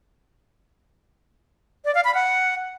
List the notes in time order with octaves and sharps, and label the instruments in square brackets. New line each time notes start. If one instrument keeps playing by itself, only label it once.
[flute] D5
F5
B5
F#5